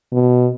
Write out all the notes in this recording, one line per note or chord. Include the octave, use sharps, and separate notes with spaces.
B2